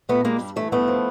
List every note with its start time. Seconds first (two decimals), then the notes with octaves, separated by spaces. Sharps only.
0.09 A#2 A3 B3
0.25 G3 G#3 A#3
0.40 G2
0.56 E3 A3
0.72 G2 A3 B3
0.88 F3